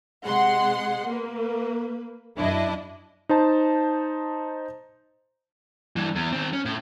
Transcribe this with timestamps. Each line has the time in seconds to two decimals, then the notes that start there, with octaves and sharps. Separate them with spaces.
0.25 C3 G#3 F#5 C6
1.06 A#3 B4
2.37 F#2 D4 E4 D#5
3.29 D#4 C5 A5
5.96 G2 E3
6.15 E2
6.32 D#3 C4
6.53 C#4
6.65 A2